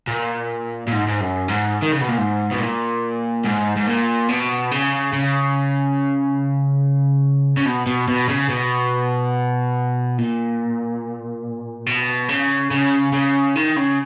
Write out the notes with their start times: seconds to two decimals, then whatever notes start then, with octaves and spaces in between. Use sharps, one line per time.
0.08 A#2
0.87 A#2
0.92 G#2
1.08 G#2
1.21 F#2
1.48 G#2
1.82 D#3
1.92 C#3
2.01 B2
2.09 A#2
2.18 G#2
2.51 B2
2.60 A#2
3.44 G#2
3.76 G#2
3.87 A#2
4.29 B2
4.71 C#3
5.13 C#3
7.57 C#3
7.66 B2
7.87 B2
8.08 B2
8.29 C#3
8.49 B2
10.18 A#2
11.87 B2
12.29 C#3
12.71 C#3
13.13 C#3
13.55 D#3
13.76 C#3